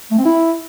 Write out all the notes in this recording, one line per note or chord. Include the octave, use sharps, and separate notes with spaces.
A3
C4
E4